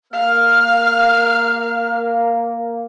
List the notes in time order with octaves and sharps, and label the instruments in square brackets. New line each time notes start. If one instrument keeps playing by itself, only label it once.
[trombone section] A#3 [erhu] F5 [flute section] F6